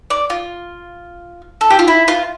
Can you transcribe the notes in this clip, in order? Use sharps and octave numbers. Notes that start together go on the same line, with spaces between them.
D5
F4
A4
G4
F4
E4
F4